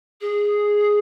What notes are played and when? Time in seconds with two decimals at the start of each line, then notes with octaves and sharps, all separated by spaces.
0.21 G#4